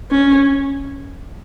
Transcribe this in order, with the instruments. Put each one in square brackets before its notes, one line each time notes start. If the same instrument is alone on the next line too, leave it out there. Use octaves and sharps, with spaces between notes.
[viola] C#4